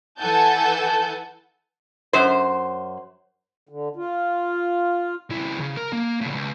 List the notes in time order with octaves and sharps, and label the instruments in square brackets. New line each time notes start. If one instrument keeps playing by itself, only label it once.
[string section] E3 A4 F#5 G#5 A5 G6
[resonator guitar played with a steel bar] F#2 C5
[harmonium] D3
F4
[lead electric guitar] C#2 E4
C#3
A#4
A#3
A2 C#3
C#2